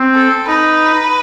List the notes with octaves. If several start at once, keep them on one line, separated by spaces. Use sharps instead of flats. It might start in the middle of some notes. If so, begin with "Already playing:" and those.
Already playing: C4
A4
D#4 B4